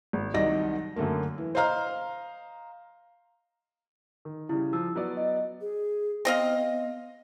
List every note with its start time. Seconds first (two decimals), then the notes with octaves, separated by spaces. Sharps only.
0.13 G#1
0.34 C2 D#3 F#3 D5 D#5 A#6
0.96 F#2 D3 A3 A#3
1.38 E3
1.55 C5 D#5 F5 A#5 F6
4.25 D#3
4.49 C#3 G3 E4
4.73 F3 E6
4.95 F#3 B3 D5
5.17 D#5
5.61 G#4
6.25 B3 C4 D#5 F5